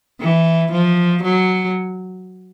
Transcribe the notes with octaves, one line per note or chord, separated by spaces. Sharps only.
E3
F3
F#3